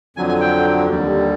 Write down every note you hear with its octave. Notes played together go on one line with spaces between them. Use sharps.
F2 D3 F#3 G#5
G#5
G5
D#2 D3 G3